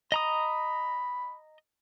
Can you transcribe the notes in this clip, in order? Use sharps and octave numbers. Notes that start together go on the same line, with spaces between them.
D#5 A#5 B5 D#6